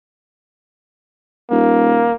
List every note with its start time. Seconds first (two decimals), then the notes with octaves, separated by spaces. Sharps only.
1.51 D#1 A#3